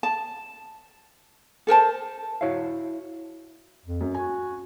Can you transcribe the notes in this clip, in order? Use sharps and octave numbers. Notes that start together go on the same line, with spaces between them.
A5
A4 A#4 C5 A5
E4 F#4 C#5 E5 F5
F2
F#2
F#4 G#5